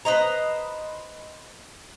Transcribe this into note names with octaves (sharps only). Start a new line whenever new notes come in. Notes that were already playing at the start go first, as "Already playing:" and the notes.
B4 C5 D#5 A#5